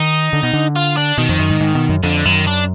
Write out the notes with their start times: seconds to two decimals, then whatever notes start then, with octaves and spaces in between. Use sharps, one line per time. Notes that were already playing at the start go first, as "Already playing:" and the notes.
Already playing: D#3 D#4
0.33 D3
0.43 B2
0.53 D3
0.76 F4
0.97 D4
1.18 B2 D#3
1.29 F2
1.39 F#2
1.50 G#2
1.61 G#2
1.75 B2
1.89 F#2
2.03 F2 D3
2.25 F#2 D#3
2.47 D4